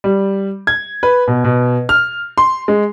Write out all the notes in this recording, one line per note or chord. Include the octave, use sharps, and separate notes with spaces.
G3
G#6
B4
B2
B2
F6
C6
G#3